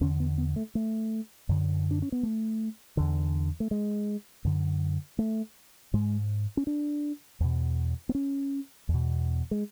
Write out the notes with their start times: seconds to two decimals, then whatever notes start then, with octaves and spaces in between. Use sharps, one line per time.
0.01 E2 D3 C#4
0.20 B3
0.38 B3
0.56 A3
0.75 A3
1.49 F#2 D3
1.91 D4
2.02 C#4
2.12 B3
2.23 A3
2.97 E2 D3
3.60 A3
3.71 G#3
4.45 F#2 D3
5.19 A3
5.94 G#2 G#3
6.57 C#4
6.67 D4
7.40 E2 B2
8.09 B3
8.15 C#4
8.89 E2
8.94 B2
9.51 G#3